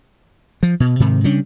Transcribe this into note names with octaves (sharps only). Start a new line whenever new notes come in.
F3
B2
G#2 C3 D#3
C#3 G3 C#4 D4